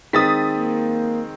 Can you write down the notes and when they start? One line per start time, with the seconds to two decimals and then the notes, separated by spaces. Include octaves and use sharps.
0.13 D#3 G#3 C4 D#6 A6 B6
0.54 A#3